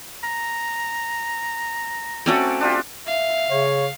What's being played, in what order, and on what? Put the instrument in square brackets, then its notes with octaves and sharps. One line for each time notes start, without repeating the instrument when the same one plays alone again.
[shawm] A#5
[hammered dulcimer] A3 D5 [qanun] C4 C#4 F#4
[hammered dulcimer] D4 F4 G4
[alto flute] E5 [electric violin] F5
[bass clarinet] C#3 [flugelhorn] C#5